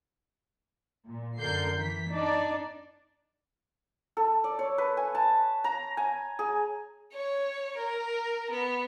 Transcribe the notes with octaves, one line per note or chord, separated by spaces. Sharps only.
A#2
F#2 D3 A#4 G6 C7
E3 B6
D4 D#4 D5
A4
D5
C#5
B4
G#5
A5
A#5
G#5
G#4
C#5
A#4
B3